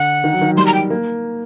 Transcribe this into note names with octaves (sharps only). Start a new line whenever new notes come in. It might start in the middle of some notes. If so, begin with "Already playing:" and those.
Already playing: D3 F#5
D#3
F#3
D#3
F#3
G3 C6
A#5
G5
A#3